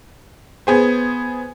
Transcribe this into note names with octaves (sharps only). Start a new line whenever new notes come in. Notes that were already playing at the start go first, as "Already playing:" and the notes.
B3 G#4 C5